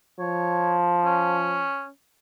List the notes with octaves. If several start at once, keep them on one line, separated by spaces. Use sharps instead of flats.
F3 C#5
C#4